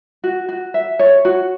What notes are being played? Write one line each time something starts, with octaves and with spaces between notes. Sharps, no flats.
F#4
F#4
E5
C#5
F#4